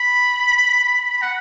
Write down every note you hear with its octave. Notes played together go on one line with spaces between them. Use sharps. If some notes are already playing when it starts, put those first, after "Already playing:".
Already playing: B5
B5
F#5